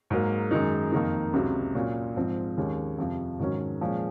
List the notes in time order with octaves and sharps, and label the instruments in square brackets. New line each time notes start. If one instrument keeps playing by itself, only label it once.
[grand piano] G#2 F#3 A#3
F#2 D#3 G#3 D#4
F2 D#3 A#3 D#4
C#2 C3 F#3
A#2 F#3 C#4 F4
G#2 F3 C4 F4
D#2 D#3 G#3 C#4
F2 C3 F3
G#2 D#3 F#3 C#4
A#2 F3 G#3 C#4